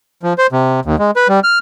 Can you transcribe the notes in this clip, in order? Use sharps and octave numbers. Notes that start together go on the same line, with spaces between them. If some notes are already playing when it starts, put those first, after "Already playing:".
F3
C5
C3
D#2
G#3
B4
G3
F6